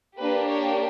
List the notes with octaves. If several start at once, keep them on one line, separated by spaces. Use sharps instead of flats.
A#3 D4 G4 B4
C#5